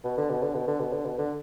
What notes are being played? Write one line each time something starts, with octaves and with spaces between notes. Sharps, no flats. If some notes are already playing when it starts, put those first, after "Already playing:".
B2
D3
B2
D3
B2
D3
B2
D3
B2
D3